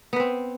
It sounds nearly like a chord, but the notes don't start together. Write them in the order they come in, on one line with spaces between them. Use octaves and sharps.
B3 B4 C4